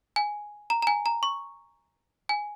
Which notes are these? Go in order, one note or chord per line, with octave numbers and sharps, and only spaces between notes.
G#5
A#5
A#5
G#5
A#5
C#6
G#5